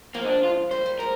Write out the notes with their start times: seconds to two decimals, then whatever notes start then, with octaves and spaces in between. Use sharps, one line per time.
0.14 F3 G#3 A#3
0.24 D#4
0.29 D4
0.43 F4
0.71 G3 A#3 C5
0.86 G3
0.99 F3 G#3 A#4